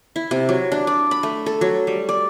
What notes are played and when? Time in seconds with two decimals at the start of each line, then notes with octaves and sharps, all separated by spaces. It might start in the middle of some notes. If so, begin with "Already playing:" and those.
0.16 E4
0.31 C3
0.49 F#3
0.72 D4
0.87 D5
1.11 B5
1.23 A3
1.46 A4
1.61 F#3
1.87 G3
2.09 D5